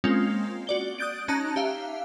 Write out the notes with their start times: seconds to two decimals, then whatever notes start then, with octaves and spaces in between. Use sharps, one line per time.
0.04 G#3 A#3 C4 C#4 F4
0.67 F#4 D5 G7
0.99 D#6 F#6 G6 A6 D7
1.28 C#4 D#4 A5 A#5 F#6
1.56 G4 E5 F5